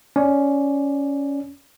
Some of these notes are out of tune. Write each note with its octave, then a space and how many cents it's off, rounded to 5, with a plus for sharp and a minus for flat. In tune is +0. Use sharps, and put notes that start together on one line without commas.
C#4 +10 D5 +5